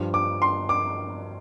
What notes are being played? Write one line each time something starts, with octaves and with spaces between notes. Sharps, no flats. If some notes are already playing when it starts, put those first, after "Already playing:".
Already playing: G2 F3
D6
C6
D6